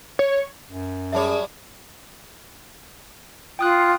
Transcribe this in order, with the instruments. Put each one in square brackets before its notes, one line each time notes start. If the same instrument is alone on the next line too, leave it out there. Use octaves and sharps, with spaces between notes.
[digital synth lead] C#5
[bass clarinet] F#2
[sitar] F#3 G3 C#5 [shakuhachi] G#4 [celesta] E5 A5
[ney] F4 [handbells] G5 D#6 F#6